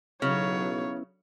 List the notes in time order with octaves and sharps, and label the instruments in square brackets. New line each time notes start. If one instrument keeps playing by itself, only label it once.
[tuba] B1 [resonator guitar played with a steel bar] C#3 [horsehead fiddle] F#3 C#5 [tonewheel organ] B3 C#4 E4